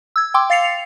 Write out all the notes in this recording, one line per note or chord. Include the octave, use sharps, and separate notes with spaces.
E6 G#6
G5 C6 D6 E6
F5 A6 C7 C#7 F7